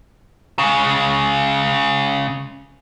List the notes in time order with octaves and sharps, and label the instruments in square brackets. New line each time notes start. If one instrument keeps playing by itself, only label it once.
[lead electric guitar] C#3 G#3